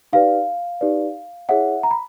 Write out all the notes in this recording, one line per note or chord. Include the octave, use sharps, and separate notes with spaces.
D#4 G4 B4 D5 F5
D#4 G4 B4 D5
E4 G#4 C#5 E5 F#5
A#5
B5